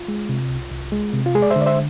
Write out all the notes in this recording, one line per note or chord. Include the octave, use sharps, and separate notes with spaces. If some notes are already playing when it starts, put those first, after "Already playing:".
Already playing: F4
G#3
C3
C2
C2
G#3
C3
F4
G#3 G#4
D5
C5 E5
D3
D5
C5 E5